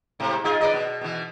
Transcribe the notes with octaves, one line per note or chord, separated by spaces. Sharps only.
G#2 C3
D#4 F4 G#4
B4 D5 D#5
B2
B2 E3